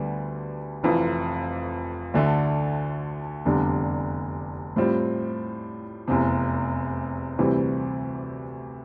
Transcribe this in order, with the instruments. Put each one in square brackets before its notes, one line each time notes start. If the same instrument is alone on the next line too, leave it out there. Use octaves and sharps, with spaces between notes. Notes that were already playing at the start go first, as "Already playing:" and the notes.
Already playing: [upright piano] D2 D3 G3 B3
F1 F2 E3
D2 D3 A3
F1 E2 D3 G3 D4
A2 G3 C4 F4
F1 E2 C3
D2 C3 E3 G3 C4